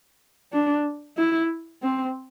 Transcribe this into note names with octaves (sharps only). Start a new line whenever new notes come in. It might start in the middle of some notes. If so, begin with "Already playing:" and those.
D4
E4
C4